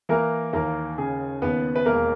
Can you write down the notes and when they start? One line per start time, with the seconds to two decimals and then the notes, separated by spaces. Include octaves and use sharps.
0.09 E3 A#3 A#4
0.53 D#2 A#3 A#4
0.98 C#3 G#4
1.42 D#2 B3 B4
1.76 B4
1.85 E1 A#3 A#4